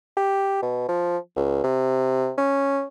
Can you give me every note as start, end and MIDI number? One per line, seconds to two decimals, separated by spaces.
0.17 0.57 67
0.62 0.84 47
0.88 1.18 53
1.36 1.62 37
1.64 2.32 48
2.38 2.84 61